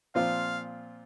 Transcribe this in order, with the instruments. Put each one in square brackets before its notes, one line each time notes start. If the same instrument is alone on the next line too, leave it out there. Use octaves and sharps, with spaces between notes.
[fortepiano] A#2 F3 C4 F4 [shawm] F5